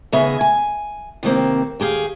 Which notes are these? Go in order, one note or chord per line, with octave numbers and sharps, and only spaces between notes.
D#2 C#3 B3 G#4 D#5 E5
G#5
C3 D#3 A#3 C4
D#2 G4 G#4 F5